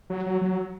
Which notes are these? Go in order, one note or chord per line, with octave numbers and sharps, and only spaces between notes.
F#3
F#3
F#3